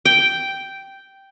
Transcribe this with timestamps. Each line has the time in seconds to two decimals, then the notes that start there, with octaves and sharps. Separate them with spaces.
0.05 G5